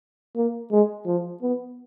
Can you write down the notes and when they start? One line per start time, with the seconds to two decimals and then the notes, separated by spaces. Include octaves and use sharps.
0.36 A#3
0.72 G#3
1.06 F3
1.42 B3